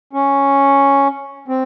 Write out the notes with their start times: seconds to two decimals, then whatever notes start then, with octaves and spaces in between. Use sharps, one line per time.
0.13 C#4
1.48 C4